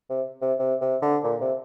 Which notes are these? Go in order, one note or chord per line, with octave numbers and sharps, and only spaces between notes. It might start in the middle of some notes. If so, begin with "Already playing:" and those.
C3
C3
C3
C3
D3
A#2
C3